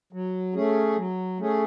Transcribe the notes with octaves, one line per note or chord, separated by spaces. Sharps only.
F#3
A3 C#4 G#4
F#3
A3 C#4 G#4